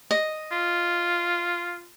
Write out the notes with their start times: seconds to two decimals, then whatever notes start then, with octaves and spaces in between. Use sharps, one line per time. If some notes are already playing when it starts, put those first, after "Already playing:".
0.11 D#5
0.52 F4